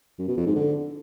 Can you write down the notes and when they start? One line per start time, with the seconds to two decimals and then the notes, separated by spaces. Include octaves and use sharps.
0.19 F#2
0.28 B2
0.37 F2
0.46 G#2
0.55 D3